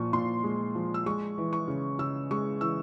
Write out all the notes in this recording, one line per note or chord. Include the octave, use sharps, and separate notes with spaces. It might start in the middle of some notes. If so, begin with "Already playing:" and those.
Already playing: A#2 F3 C#6
A#2 C6
G#3
F3
E6
G#3 C#6
E3
C#6
C#3
C#3 E6
G#3 C#6
E3 E6